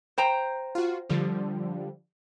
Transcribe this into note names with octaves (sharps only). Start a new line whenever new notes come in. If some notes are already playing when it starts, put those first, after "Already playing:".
C5 G5 A#5
F4 F#4
D3 F3 G3